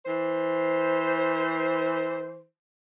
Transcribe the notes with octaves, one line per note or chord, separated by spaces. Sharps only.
E3 C5